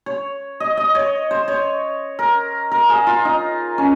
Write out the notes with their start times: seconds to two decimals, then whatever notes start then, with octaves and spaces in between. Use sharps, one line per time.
0.06 C#5
0.60 D#5
0.77 D#5
0.95 C#5
1.31 C5
1.48 C#5
2.19 A#4
2.71 A#4
2.89 G#4
3.07 F4
3.25 D#4
3.78 C#4